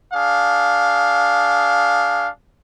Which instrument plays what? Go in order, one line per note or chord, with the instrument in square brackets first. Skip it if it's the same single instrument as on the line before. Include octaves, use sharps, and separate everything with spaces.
[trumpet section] D4 G#4 F5